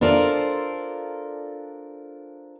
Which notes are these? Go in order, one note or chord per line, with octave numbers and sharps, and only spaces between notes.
D4 F4 A4 A#4 C5 D5